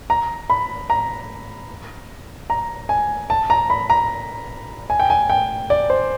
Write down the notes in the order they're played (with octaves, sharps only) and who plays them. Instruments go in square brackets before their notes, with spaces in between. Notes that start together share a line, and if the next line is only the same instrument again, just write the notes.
[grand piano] A#5
B5
A#5
A#5
G#5
A5
A#5
B5
A#5
G#5
G5
G#5
G5
D5
C5